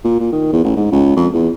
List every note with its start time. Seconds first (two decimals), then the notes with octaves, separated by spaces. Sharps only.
0.04 A#2
0.20 A#2
0.32 D#3
0.53 E2
0.64 A1
0.77 G#2
0.92 C#2
1.17 F2
1.33 E2